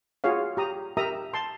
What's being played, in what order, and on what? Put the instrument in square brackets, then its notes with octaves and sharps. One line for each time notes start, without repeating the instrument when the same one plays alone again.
[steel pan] F4 F#4 G#4 C#5 F5
G4 A#5 D#6
G4 A#4 E5 A#5 D#6
A5 C6